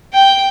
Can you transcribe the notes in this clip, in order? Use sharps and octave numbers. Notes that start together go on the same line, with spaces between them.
G5